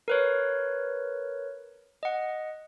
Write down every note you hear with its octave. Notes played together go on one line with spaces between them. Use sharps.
A#4 B4 C#5
D#5 F#5